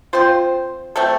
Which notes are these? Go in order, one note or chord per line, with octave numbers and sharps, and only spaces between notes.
C4 F4 C5
A3 C4 A4